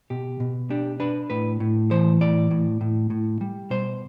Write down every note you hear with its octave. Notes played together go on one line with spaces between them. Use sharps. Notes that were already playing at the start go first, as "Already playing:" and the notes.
B2 G4
B2
D4 G4
D4 B4
A2 B4
A2
E3 C5
A2 D5
A2
A2
A2
G3
B2 C5